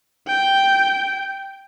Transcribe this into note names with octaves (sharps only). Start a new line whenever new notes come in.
G5